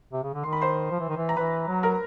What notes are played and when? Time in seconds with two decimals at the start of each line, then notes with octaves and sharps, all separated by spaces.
0.12 C3
0.23 C#3
0.34 D3
0.44 D#3 C6
0.53 B5
0.61 C5 C6
0.91 F3
0.99 E3
1.08 D#3
1.17 E3
1.29 A#5
1.36 E3 B4 B5
1.68 F#3
1.83 A#4 A#5